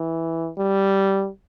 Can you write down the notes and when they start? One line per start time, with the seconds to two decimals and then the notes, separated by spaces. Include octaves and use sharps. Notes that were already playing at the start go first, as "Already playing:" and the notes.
Already playing: E3
0.58 G3